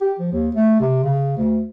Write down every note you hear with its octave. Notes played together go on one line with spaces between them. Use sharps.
G4
F3
D#2
A3
C3
C#3
D2